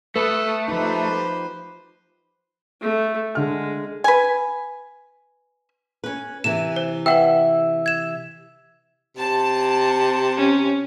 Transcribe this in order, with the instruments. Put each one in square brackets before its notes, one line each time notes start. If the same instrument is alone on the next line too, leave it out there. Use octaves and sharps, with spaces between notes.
[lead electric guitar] A3 [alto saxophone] A4 [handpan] B4 [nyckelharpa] D#6
[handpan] F3 D#4 [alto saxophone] G4 [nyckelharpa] B4 C5
[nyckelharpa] A3
[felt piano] D3 F6 [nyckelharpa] G#3
[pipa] B4 G#5
[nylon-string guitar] C#4 B4
[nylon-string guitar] C3 E3 [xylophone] E7
[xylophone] C5
[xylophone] B4 F#5 G5 [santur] E5
[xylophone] G#6 E7
[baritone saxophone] C3 [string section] A5
[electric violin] C#4